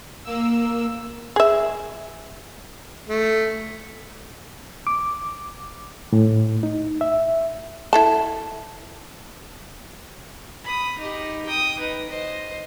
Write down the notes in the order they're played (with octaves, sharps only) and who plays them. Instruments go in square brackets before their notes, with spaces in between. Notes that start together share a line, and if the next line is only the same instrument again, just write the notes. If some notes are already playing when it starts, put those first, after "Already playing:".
[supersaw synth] A#3 E6
[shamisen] G#4 E5
[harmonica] A3
[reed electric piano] D6
A2
D#4
E5
[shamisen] E4 A4 A5
[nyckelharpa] B5 D#6
D#4 G4
G5 D#6
D#4 B4
C5 D#5